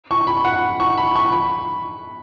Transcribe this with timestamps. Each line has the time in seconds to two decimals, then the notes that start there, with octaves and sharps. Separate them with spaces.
0.11 C#6
0.27 B5
0.45 F#5
0.80 C#6
0.98 B5
1.16 C#6
1.32 B5